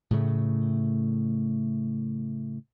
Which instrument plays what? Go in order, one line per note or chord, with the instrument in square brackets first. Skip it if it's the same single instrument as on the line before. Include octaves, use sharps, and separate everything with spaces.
[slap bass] A2 C#3 A3